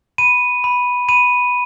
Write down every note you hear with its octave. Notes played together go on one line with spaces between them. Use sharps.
B5 D#7
B5
B5 D#7